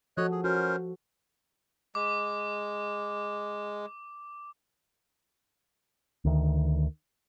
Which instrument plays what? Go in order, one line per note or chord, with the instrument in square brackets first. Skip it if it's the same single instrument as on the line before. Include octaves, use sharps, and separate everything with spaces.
[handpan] F3 F#4 A4 [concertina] C#5 D#5 F#6
[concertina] G#4
[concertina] C#4 A#4 C5 [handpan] F#4
[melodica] G#3 [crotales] D6
[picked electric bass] D2 D#3